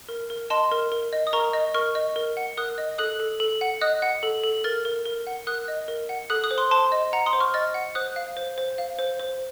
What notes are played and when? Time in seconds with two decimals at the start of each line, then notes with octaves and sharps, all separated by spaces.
0.09 A#4
0.30 A#4
0.50 D#5 A5 C6
0.71 A#4
0.92 A#4
1.13 D#5
1.27 D#6
1.33 A#4 A#5 C#6
1.53 D#5
1.74 A#4 C#6 F6
1.95 D#5
2.16 A#4
2.37 F#5
2.57 A#4 D#6 F#6
2.78 D#5
2.98 A4 D#6 F#6
3.20 A4
3.40 A4
3.61 F#5
3.81 D#5 D#6 F#6
4.02 F#5
4.23 A4
4.43 A4
4.64 A#4 F6 A6
4.85 A#4
5.06 A#4
5.27 F#5
5.47 A#4 D#6 F#6
5.68 D#5
5.88 A#4
6.09 F#5
6.30 A4 D#6 F#6
6.44 D#6 F#6
6.51 C5
6.58 C6 D#6
6.71 C5 A5 C6
6.92 D#5
7.13 F#5 A#5
7.26 C6 D#6
7.33 C5
7.40 C#6 F6
7.54 D#5 F6 A6
7.74 F#5
7.95 C5 D#6 F#6
8.16 F5
8.37 C5
8.58 C5
8.78 F5
8.99 C5
9.19 C5